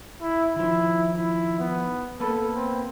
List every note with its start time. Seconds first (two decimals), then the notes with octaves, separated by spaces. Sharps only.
0.21 E4
0.56 D#3 F3 E4
1.17 E4
1.60 B3
2.20 A#3 B3 A4 B4
2.55 C4